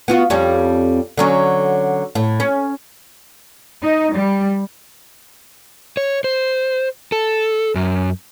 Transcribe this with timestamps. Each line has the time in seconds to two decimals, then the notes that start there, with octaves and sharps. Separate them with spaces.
0.08 B3 F4 F#4
0.30 F2 G3 C#4
1.17 D3 F#3 C#4
2.15 A2
2.40 C#4
3.83 D#4
4.14 G3
5.97 C#5
6.24 C5
7.12 A4
7.75 F#2